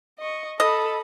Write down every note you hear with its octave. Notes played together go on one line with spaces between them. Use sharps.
D#5 C#6
A4 D#5 B5